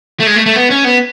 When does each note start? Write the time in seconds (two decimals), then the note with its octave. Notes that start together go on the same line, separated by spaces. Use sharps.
0.20 A3
0.27 G#3
0.36 A3
0.46 A3
0.56 B3
0.70 C#4
0.84 B3